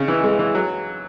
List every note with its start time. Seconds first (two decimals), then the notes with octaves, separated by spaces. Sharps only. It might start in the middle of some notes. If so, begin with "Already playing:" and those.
Already playing: C#3 D#4
0.08 E3
0.24 G#3
0.39 E3
0.55 F#3